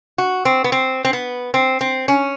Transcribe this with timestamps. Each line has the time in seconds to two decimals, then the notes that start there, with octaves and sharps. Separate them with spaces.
0.18 F#4
0.45 C4
0.64 B3
0.72 C4
1.05 C4
1.13 B3
1.54 C4
1.81 C4
2.08 C#4